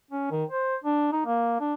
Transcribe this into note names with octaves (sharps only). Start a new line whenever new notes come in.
C#4
D#3
C5
D4
D#4
A#3
D4